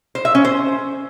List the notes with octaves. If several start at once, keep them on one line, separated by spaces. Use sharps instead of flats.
C5
E5
C#4
C5